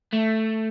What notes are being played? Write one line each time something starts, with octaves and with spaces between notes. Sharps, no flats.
A3